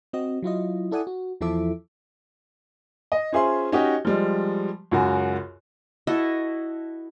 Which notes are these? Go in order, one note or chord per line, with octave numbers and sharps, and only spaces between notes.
C4 F#4 D#5
F#3 E4 F4 D#5
E4 A4 D5 F#5 G#5 D#6
F#4
E2 F3 E4 A4 E5 D6
D#5
C#4 F4 G#4 C5 E5 C6
C#4 D#4 F#4 G4 D#5
F3 G3 G#3
C#2 F#2 F#4
E4 F#4 A4 D#5